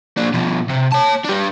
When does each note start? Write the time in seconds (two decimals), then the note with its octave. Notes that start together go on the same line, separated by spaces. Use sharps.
0.17 A#2 D4
0.34 B2 F3
0.69 C3
0.92 C#5 A5
1.24 D4 G4